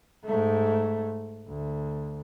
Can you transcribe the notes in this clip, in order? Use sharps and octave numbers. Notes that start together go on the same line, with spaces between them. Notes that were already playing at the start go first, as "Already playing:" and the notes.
G#2 A3
D2